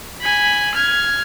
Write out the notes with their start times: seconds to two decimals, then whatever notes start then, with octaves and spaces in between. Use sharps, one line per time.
0.22 G#5 B5
0.75 F6 G#6